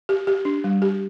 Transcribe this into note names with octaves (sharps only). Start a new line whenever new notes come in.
G4
G4
D4
G3
G4